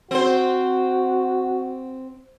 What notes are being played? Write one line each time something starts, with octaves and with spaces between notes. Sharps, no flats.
C4 F#4 C5